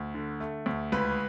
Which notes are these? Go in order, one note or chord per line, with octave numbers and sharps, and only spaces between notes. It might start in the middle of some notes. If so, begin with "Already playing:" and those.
Already playing: D2
D3
A3
D2
C#2 B4